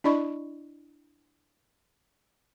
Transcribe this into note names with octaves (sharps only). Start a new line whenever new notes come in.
D4 E4 D5 D#5 B5 C#6